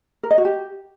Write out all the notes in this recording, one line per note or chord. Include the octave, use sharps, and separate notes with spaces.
A#4
D#5
F#4
G4